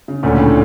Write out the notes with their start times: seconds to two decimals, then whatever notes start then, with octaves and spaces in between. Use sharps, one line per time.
0.08 C#3
0.23 D2 A#2 D3 A3 C#4
0.38 A2